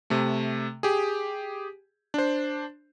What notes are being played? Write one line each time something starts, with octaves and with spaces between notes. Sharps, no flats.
C3 A3
G4 G#4
D4 C5